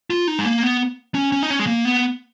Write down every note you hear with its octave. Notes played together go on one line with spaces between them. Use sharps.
F4
D#4
G#3
A#3
B3
C#4
C#4
D#4
C#4
G#3
A#3
B3